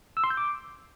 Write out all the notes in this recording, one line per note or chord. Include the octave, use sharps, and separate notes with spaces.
E6
C6
G6
D6